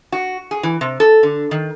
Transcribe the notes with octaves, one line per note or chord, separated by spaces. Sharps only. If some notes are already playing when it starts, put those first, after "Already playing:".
F#4
G#4
E3
C3
A4
D3
D#3